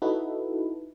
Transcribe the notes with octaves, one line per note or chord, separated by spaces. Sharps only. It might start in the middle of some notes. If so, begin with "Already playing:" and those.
D#4 E4 F#4 A4 B4